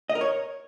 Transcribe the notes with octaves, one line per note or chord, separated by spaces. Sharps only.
D#5
A#4
C#5